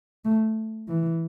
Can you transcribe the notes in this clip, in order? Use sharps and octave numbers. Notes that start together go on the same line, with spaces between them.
A3
E3